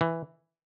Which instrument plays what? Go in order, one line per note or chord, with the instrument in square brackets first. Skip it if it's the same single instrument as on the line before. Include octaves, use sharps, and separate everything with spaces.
[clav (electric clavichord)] E3